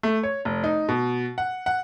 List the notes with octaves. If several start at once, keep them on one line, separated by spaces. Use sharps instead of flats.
A3
C#5
F1
D#4
B2
F#5
F#5